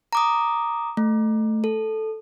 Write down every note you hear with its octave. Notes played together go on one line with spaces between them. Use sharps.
A#5 D6 D#6
A3
A4